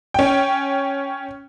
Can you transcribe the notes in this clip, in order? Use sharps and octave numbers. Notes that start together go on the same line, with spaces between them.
C#4 G5